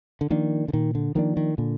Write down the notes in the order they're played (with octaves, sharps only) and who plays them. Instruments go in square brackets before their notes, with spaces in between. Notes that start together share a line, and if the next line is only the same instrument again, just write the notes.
[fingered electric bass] D3
[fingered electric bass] D#3 [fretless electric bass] F3 A#3 D4
[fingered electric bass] D3
[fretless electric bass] A#2 [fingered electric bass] D#3
[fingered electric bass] D3
[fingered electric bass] D#3 [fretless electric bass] F3 A#3 D4
[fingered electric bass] D#3
[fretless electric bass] A#2 [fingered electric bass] D3